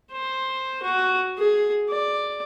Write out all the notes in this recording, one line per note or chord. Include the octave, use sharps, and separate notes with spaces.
C5
F#4
G#4
D5